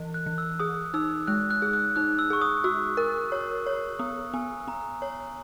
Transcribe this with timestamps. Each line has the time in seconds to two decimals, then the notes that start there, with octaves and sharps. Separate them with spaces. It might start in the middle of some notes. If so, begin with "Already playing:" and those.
Already playing: E3
0.14 F#6
0.26 E3
0.38 E6
0.60 G#4 D#6
0.94 D#4 E6
1.27 G#3 F#6
1.51 F#6
1.62 G#4
1.73 F#6
1.96 D#4 F#6
2.19 E6
2.30 G#4 C#6
2.41 D#6
2.64 F#4 E6
2.97 A#4
3.32 C#5
3.66 C#5
3.99 B3 D#6
4.34 B3 G#5
4.68 B3 A#5
5.02 C#5